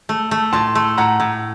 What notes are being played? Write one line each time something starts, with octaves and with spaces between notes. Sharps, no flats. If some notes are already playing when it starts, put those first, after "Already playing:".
A3
A3
A2 A5 C6
A3
A2 F#5 A#5
A2